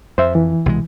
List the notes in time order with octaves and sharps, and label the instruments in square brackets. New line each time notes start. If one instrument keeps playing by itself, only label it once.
[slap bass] F2 [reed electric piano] C5 E5
[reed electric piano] E3
[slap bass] C2 B2 G#3